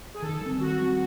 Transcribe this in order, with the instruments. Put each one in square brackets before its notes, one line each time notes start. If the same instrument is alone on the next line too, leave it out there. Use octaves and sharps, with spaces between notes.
[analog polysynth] G#4
[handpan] D#3 [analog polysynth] A4
[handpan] G3 C4
[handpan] D#3 [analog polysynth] F#4
[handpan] G3 C4